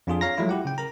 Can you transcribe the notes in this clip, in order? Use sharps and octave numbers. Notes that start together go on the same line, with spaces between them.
F2 D4 F4 G#4
C#5 F5 A#5 A#6
F3 F#3 G#3 A3 E4 F4
E4 G4 F#5
C#3 G5
A#4 A#5